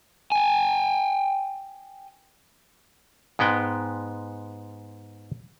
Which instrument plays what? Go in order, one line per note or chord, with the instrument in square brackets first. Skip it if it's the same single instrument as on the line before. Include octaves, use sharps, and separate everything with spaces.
[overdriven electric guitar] G5 G#5
[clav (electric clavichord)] G#2 G#3 B3 G5